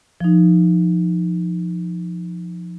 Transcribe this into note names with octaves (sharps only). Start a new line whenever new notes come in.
F3 D#4